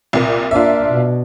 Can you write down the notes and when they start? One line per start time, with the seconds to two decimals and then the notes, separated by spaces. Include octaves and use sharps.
0.13 C2 A#2
0.51 A#3 D4 F4 E5
0.92 B2